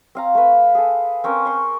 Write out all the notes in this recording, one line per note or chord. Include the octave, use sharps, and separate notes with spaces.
C4 F5 A#5
A3 B4
G#4 A4
C4 C#4 A#4
C6 C#6